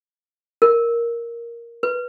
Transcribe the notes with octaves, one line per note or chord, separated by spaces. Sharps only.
A#4
B4